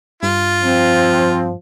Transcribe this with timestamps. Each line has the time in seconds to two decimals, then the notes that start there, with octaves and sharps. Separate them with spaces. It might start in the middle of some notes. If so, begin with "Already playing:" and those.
0.23 G2 F4
0.63 F3 C4